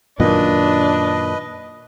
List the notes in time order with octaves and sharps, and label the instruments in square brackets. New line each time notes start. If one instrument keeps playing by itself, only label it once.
[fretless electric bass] F#2 A#2 D#3 [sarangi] D4 [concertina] B4 D#5